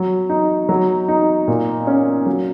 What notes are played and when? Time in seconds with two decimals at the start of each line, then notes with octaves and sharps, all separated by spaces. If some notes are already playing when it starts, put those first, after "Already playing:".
Already playing: F#3
0.29 D#4
0.69 F#3
1.08 D#4
1.47 A#2
1.87 C#4
2.26 F#3